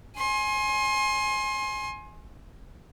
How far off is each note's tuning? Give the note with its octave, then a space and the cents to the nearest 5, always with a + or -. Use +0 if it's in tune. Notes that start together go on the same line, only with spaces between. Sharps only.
G#5 +15 C6 +30